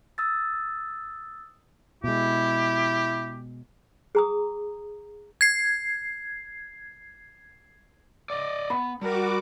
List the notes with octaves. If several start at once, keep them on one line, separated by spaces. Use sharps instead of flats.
D#6 E6 A6
B2 G#3 E4 G4
G#4 A#5 D#6
G#6 C7
D5 D#5
B3 B5
G3 F#4 A#4 D6